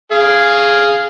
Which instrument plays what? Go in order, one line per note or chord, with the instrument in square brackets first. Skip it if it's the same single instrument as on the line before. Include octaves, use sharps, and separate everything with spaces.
[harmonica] G#4 F5